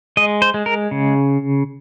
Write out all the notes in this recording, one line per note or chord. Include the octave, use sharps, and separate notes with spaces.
G#3 D#5
C5
G#3
A#4
C#3